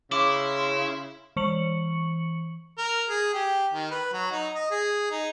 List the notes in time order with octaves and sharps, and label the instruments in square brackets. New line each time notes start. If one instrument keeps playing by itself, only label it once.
[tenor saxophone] C#3 [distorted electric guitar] E4 [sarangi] C6 [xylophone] D6
[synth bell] E3 C#6 C#7 F#7
[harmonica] A#4
G#4
G4
D#3
B4
F#3
D#4
D#5
G#4
D#4